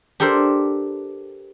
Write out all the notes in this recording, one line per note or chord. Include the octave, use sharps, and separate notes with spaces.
D4 G4 A4 A#4 C5